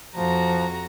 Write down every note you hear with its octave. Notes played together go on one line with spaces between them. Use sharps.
F2 F3 F#4 A#5